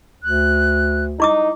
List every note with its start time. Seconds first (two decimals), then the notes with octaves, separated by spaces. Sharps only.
0.23 D2 F#6
1.20 D#4 E4 D6 D#6